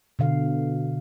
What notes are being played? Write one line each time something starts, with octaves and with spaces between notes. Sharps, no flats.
B2 D3 F5